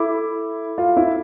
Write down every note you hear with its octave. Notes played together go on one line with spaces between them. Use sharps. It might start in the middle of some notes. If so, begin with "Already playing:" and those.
Already playing: E4 A4 E5 B5 D6
F4
E4